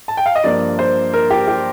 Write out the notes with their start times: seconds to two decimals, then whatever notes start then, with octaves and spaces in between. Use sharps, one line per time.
0.08 A5
0.17 G5
0.26 F5
0.35 D#5
0.43 G2 F3 A#3 D5
0.79 C5
1.13 A#4
1.30 G4
1.48 G4